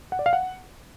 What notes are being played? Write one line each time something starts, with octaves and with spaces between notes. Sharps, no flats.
F#5
D5
F5
F#5